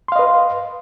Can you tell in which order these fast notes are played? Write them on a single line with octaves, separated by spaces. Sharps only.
C6 F5 D#5 B4